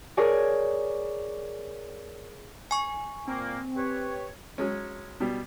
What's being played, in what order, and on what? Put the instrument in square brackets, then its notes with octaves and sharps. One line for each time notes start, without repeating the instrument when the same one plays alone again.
[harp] G#4 A#4 C#5 D5 G#5
[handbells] G#5 C#6
[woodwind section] A#2 A#3 [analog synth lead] C4
[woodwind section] G4 B4 C#5
[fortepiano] F#3 G#3 C#4
B2 G3